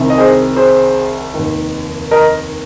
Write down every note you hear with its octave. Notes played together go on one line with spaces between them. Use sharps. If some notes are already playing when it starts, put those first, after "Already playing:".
Already playing: C2 C3 D#3
D#5
G#4 C5
G#4 C5
F1 D#2 D#3
A#4 D#5